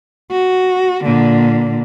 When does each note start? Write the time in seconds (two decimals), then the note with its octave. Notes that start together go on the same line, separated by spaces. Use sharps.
0.31 F#4
1.05 A#2 D3